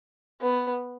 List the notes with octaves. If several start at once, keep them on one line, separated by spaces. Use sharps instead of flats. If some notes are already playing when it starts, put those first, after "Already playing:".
B3